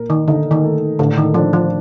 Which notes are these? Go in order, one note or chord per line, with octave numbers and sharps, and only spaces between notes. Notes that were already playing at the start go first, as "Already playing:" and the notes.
Already playing: A#2 A#4
D#3
D3 D#4
D#3
A3
A2 D3
D#3
F3 D4
F3